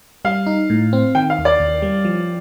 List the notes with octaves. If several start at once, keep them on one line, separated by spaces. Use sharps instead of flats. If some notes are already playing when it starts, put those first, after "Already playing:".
G3 F5
D#4
A2
C4
D#3 G5
F5
D#2
D5
D#2
G3
F3